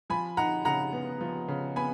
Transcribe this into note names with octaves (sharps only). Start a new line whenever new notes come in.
F3 G#5 B5
D#4 F#5 A#5
C#3 F#5 A#5
B3
F3
C#3
B3 G#5 B5